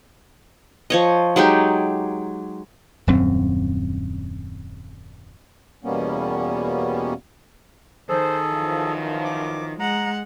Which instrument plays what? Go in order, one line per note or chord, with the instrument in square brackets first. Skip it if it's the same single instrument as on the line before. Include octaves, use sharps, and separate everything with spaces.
[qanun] F3 C#5 D#5
F#3 G#3 D#4 G4
[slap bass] D#1 F#2 C4
[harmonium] E2 B2 G3 A#3 B3 C#4
[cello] D#3 [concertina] G#4 A4 [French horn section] C5
[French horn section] F#2 E3 F3
[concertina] D6
[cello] G#3 F#5 [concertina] A#5